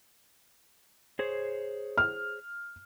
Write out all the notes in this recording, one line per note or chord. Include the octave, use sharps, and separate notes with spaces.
G#4 C5 C#5
F6